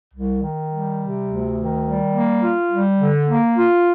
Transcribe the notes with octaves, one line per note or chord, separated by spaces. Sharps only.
C2
D#3
G3
C3
D2
D#3
G3
A#3
F4
G3
D3
A#3
F4